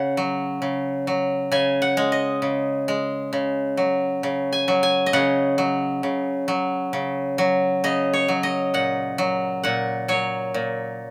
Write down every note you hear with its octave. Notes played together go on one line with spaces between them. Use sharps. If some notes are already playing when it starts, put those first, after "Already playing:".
Already playing: C#3 F#5
F#3
C#3
F#3
C#3 G#5
F#5
G#3
D#5
C#3
G#3
C#3
F#3
C#3
G#5
F#3
G#5
D#5
C#3 F#5
F#3
C#3
F#3
C#3
F#3
C#3 D#5
C#5
F#3
D#5
A#2 F#5
F#3
A#2 F#5
F#3 C#5
A#2